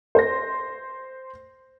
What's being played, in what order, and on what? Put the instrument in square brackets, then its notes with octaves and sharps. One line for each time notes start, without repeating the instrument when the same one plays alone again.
[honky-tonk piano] C5 C6 A#6